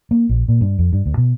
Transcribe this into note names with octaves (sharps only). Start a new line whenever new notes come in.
A#3
A#1
A#2
G2
F2
G2
D2
B2